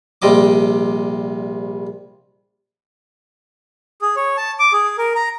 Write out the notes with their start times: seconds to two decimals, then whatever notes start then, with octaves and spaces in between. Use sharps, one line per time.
0.22 A#1 C3 G3 D#5 D6
4.02 G#4
4.16 C#5
4.37 A5
4.59 D6
4.73 G#4
4.98 A#4
5.16 A#5